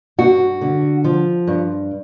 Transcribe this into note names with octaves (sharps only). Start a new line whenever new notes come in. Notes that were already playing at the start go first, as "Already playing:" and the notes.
G2 F#4
D3
F3
G2